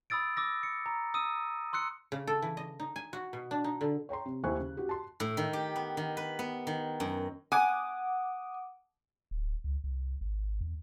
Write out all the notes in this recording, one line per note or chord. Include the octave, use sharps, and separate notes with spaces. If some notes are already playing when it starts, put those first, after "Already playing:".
B5 D#6 E6 A6 D7
D6 E6 A#6
C#7
A#5
D#6 E6 D#7
C6 E6 F#6 C#7
C#3
A4
E3
D#5
D#4
G#5
F#4
B2
D4
D#4
D3
C#5 G5 A#5 C6
C3
D#2 E4 C5 G#5 C#6 F#6
C#3
F#4 G4
A5 C6
A2
D#3
G4
B3
D#3
B4
B3
D#3
F#2
F#5 G#5 D6 D#6
D1
C#2
C2
G#1
E2